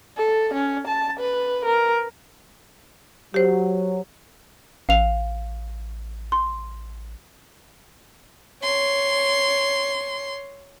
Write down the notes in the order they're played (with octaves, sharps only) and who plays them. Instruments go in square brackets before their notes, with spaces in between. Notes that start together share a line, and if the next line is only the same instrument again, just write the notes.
[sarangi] A4
C#4
A5
B4
A#4
[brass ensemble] F#3 [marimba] G4 C5
[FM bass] A1 [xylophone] F5 F7
[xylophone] C6
[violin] C#5 C6